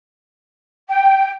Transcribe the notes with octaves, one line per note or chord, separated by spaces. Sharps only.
G5